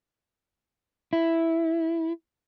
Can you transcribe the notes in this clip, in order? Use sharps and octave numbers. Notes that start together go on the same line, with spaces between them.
E4